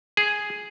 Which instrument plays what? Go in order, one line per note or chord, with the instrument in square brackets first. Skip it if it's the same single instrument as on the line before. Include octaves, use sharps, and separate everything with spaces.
[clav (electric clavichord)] G#4